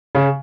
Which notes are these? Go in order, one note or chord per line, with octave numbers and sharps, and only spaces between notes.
C#3